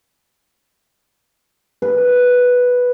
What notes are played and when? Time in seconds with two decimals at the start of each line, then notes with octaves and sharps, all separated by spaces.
1.82 B4